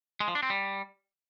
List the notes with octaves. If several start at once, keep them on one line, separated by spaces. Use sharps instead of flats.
G#3
F3
D4
C4
G3